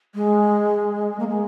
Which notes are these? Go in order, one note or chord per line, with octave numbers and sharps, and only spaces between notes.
G#3
A#3
G#3